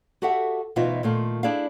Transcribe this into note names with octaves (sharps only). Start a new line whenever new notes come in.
F#4 G4 A4 E5 F#5
D2 B2 E3 D#4 F4 E5
A#2 D#3 A3 F4
D4 E4 G#4 D5 F5